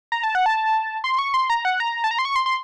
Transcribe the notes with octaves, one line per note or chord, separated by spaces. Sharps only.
A#5
A5
F#5
A5
C6
C#6
C6
A#5
F#5
A#5
A5
A#5
C6
C#6
C6
C6